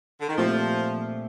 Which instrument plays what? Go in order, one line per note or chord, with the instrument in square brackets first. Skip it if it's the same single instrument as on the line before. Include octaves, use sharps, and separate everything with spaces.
[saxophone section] D3
D#3
[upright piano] A#2 A3 C4 G4 C5 [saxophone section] F3